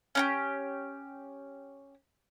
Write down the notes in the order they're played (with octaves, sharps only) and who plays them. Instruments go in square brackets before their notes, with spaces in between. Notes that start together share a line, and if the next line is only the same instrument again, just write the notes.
[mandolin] C#4 D#4 G4